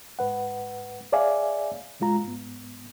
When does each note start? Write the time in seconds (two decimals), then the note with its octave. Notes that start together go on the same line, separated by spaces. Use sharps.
0.19 G#2 B4 F#5
1.12 G#4 C#5 D5 E5 F5 G#5
2.00 D2 A#2 G#3 F4 A#5
2.23 G#2 B3